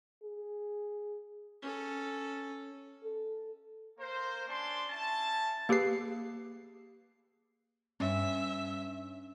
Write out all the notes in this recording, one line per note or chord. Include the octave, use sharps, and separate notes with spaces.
G#4
C#4 A4
A4
A#3 A#4 C5
C#4 D4 D5 A5 C6
C#4 E4 A5
A#3 G4 G#4 B4 C7
G2 C#4 E5